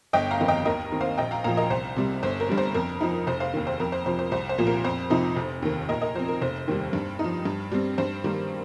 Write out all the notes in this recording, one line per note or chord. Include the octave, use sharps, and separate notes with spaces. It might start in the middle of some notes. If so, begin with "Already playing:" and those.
G1 D#5 G5
F5 A#5
F2 D#3 C4 D#4
D#5 G5
D#2 A#4 D#5
D#3 C4
C5 F5
A#1 D#5 G5
F5 A#5
A#2 F3 F5 A#5
A#4 D#5
C2 C5
C3 G3
G1 C5
A#4
G2 G3
C5
F2 A#4
F3 D#4
F1 C5
C5 F5
D#2 D#3
C5
F2 A#4
C5
C3 F3 C5
C5
C2 C5
C5
A#2 F3 A#3 F4
A#4
F2 C5
C3 F3 D#4
F1
D#2 D#3
A#2 A#4 D#5
A#4 D#5
F3 C4 C5
A#4
F1 C5
D#2 D#3 G3
G2
D#4
F3
G2
G3 C4
G2 C5
D#3 G3 A#3